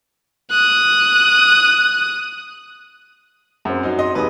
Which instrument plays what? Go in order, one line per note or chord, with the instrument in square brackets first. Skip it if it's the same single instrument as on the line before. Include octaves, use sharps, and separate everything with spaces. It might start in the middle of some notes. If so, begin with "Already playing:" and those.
[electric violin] D#6 F#6
[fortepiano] F#2 C4
[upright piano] F#3 D#4
D#5 C6
[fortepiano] G#1 D#2 D#6 [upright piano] B4